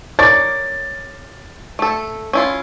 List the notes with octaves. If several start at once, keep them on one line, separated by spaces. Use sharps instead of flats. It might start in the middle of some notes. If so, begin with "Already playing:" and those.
A#4 C#5 D5 A6
A3 A4
C#4 E4 F4